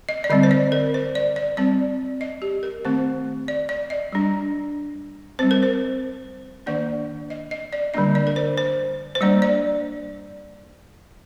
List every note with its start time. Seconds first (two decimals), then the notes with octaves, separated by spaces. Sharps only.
0.09 D#5
0.24 D5
0.30 D3 G3 C4 D#5
0.43 C5
0.51 D5
0.72 A#4
0.94 C5
1.15 D5
1.36 D5
1.57 G3 C4 D5
2.21 D#5
2.42 G4
2.63 A#4
2.85 D#3 A3 C4 C5
3.48 D5
3.69 D5
3.90 D#5
4.13 G3 D4
5.39 G3 C4 C5
5.51 A#4
5.63 C5
6.66 D#3 A#3 D4 D5
7.30 D#5
7.51 D#5
7.73 D5
7.94 D3 G3 A#3 D4 D#5
8.15 D5
8.27 A#4
8.36 C5
8.57 C5
9.15 C5
9.21 G3 A#3 D4 D5
9.42 D5